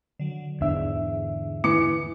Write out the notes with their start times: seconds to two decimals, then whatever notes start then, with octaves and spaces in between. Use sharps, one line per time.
0.19 D3 F#3
0.61 E2 G#2 D3 D4 E5
1.64 E3 D6 C#7